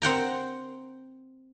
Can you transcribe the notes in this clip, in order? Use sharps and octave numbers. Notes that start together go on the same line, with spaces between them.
C4 F#5 G5 A#5